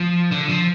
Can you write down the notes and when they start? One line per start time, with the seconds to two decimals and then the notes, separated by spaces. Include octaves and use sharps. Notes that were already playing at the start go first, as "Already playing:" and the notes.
Already playing: F3
0.32 D3
0.49 F3